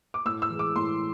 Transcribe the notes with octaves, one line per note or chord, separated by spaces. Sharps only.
D6
A2 E6
E6
E3 G#3
D6
A2 C6